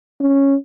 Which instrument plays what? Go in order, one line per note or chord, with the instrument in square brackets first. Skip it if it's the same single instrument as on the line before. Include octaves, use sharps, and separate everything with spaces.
[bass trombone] C#4